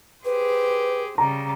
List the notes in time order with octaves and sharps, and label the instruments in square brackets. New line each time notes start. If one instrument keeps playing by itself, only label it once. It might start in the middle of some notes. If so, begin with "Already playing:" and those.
[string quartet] G4 G#4 C5 [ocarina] B4
[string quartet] C#3 G3 [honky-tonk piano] A#5